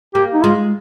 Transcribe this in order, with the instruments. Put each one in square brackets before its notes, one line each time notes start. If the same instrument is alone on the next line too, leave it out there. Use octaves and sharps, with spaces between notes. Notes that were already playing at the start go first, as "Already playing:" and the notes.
[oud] A#3 [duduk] G4
[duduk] D#4
[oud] G#3 [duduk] F4